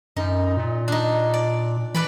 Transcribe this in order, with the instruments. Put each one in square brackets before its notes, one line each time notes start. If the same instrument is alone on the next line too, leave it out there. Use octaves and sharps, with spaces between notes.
[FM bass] F#2 [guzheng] D#4
[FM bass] A#2
[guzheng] D4 D#4
D5
[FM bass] E3 [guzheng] B4 D5 B5